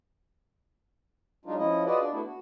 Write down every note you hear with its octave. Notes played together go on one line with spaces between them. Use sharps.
F#3 G#3 D4 D#4 F4
F3 C#4 E4 D#5
F4 F#4 G#4 B4 D5 D#5
D4 D5
A3 B3 D4 E4 F#4
F#4